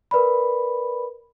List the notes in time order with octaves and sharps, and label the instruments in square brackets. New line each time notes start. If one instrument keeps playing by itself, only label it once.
[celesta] A#4 B4 D5 B5